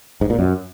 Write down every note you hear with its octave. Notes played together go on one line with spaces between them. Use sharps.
G#2
A#2
F#2